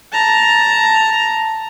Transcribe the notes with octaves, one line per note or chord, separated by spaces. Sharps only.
A5 A#5